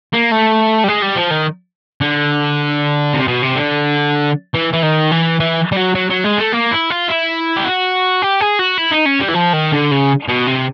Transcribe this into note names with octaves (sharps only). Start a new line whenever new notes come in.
A#3
A3
G3
G#3
G3
F3
D#3
D3
C3
B2
C3
D3
E3
E3
D#3
E3
E3
G3
F#3
F#3
F#3
G#3
A3
A#3
E4
F4
E4
G4
F#4
G4
G#4
F#4
E4
D#4
C#4
G3
E3
F3
D#3
D3
C#3
B2
C3